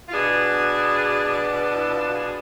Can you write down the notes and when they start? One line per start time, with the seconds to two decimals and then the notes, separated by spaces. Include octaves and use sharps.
0.08 F4
0.13 B2 B3 D4 G#4
1.74 E4
1.94 F4
2.14 G#4